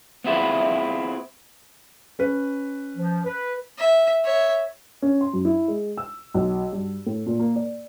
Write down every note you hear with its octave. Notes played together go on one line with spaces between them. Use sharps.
B3 C4 E4 F4 G#4 B4
C#4 B4
F3
B4
E5
C#5 E5
C#4
C6
F#2
E4
G#3
E6
B1
G2
A2
A#2
A#3
D5